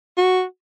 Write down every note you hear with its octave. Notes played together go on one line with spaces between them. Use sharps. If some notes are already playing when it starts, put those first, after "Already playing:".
F#4